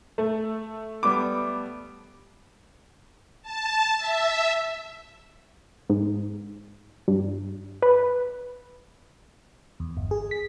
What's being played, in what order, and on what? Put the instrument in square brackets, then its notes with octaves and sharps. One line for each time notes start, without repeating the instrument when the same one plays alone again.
[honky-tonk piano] A3
[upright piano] G3 B3 D6
[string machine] A5
E5
[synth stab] G#2
G2
B4
[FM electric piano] E2
G1
G#4
B6